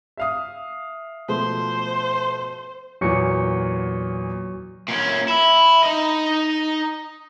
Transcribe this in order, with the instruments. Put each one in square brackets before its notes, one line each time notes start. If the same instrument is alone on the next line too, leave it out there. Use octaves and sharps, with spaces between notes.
[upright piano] E5 F5 D#6
[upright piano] B2 F3 A3 [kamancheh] C5
[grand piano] E2 A#2 [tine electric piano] F#3 C#6 C#7
[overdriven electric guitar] A#2 C#4
E4
D#4 D#5